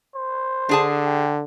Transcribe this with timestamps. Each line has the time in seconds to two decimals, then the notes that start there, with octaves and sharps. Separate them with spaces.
0.15 C5
0.69 D3 D4 G#4 A5
1.06 G5